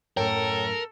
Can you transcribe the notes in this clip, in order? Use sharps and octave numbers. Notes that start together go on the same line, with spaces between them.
F#2 A2 A4 A#4 C#5 G5